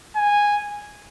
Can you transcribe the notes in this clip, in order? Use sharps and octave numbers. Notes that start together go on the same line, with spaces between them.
G#5